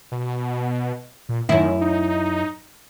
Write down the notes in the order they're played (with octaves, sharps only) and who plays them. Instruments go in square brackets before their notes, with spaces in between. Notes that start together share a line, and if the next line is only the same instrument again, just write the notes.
[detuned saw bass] B2
A#2
[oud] F#2 E4 [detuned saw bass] D#3
[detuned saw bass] D#4